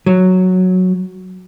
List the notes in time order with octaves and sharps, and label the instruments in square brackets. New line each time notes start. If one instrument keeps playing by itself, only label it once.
[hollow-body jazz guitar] F#3